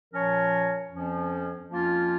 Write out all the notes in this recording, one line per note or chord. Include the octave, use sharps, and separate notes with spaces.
A#2 F3 C#4 A#4 C#5
F2 F3 C#4
F2 F3 A#3 C#4 F4